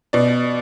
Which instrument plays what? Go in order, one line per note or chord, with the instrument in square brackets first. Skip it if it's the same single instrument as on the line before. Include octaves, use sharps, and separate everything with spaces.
[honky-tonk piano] B2 D5